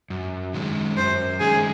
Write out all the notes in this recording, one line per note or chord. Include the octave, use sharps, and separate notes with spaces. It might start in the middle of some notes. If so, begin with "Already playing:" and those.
F#2
D#3 G#3 C#4
F#2 C5
D#3 G#3 C#4 G#4